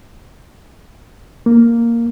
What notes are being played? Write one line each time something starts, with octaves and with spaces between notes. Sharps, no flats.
A#3